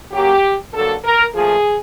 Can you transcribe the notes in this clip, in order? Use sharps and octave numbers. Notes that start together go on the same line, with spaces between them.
C#3 F#3 A#3 G4
G2 D3 F#3 A#3 A4
A#4
A#2 F3 A3 G#4